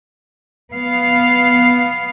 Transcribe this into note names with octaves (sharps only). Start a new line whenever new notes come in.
B3 F5